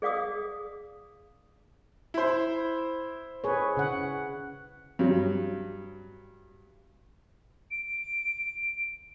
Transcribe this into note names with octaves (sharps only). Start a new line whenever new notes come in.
G#4 D5 F5 D6 D#6
E4 C5
G#4 B4 C#5
C#3 F#5
G2 F#3
D7